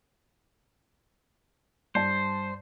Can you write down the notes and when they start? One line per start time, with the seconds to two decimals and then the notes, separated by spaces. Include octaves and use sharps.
1.95 G2 C5 D5 A5